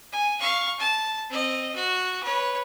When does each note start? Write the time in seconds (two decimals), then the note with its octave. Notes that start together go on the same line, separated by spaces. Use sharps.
0.12 G#5
0.41 F5 C#6
0.80 A5
1.30 C4 D#5
1.76 F#4
2.23 B4 C#5